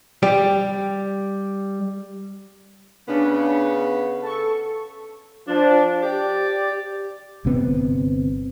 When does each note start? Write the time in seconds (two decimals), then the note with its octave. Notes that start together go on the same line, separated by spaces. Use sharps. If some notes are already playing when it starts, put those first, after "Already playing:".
0.23 G3 G4 D5
3.09 C#3 B3 D4
4.22 A4 C#6
5.48 F3 D4
6.02 G4 D5
7.45 G1 C3 B3 C4